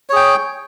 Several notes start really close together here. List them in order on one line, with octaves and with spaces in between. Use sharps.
C#5 G#4 G5